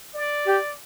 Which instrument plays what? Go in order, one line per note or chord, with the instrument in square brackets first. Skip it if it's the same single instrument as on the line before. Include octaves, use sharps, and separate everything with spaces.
[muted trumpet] D5
[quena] G4